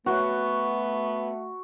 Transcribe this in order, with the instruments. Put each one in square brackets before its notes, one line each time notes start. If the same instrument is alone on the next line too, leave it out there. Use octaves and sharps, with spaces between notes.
[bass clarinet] A3 [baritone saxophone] B3 [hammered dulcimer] F#4